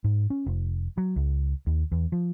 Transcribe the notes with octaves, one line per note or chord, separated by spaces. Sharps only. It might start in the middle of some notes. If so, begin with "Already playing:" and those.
G#2
C#4
F1
F#3
C#2
D#2
E2
F3